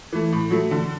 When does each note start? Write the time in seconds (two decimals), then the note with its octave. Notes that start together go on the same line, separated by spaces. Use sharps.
0.12 E3 A3
0.32 A2
0.51 F#3 A3
0.71 D3